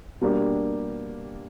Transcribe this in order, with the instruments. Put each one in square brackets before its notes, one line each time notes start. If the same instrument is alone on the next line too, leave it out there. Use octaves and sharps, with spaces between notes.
[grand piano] B2 G3 A#3 D4 G4